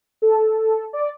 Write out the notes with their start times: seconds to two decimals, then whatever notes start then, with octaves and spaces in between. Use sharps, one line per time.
0.22 A4
0.93 D5